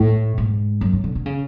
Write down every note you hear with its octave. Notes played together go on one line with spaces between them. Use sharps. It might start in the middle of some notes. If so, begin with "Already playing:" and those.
Already playing: A2
G#2
F#2
D3
D3
D3
C#3